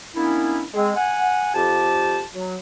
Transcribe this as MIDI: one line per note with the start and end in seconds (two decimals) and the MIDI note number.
0.15 0.63 51
0.15 0.63 58
0.15 0.63 59
0.15 0.63 61
0.15 0.63 62
0.15 0.63 64
0.74 0.92 56
0.74 0.92 60
0.96 1.53 78
0.96 1.53 80
1.55 2.21 41
1.55 2.21 67
1.55 2.21 81
2.33 2.57 54